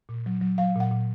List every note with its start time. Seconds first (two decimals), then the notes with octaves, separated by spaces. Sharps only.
0.09 A#2
0.26 F#3
0.42 F#3
0.58 F#3 F5
0.75 A#2 F#5
0.91 A#2